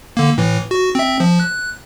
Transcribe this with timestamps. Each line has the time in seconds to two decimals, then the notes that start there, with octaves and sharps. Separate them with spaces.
0.17 D3 A#3
0.38 A2 E3
0.71 F#4
0.95 C4 E5
1.20 F3
1.40 F#6